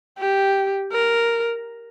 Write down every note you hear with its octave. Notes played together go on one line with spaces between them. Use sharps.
G4
A#4